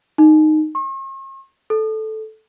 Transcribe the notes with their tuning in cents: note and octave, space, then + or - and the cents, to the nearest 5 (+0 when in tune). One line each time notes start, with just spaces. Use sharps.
D#4 -10
C#6 -45
A4 -10